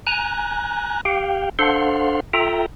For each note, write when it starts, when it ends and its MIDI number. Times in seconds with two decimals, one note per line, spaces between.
0.07 1.01 80
0.07 1.01 82
0.07 1.01 90
1.05 1.49 67
1.05 1.49 77
1.05 1.49 79
1.59 2.20 62
1.59 2.20 69
1.59 2.20 72
1.59 2.20 77
1.59 2.20 78
1.59 2.20 84
2.33 2.66 65
2.33 2.66 69
2.33 2.66 76
2.33 2.66 79
2.33 2.66 82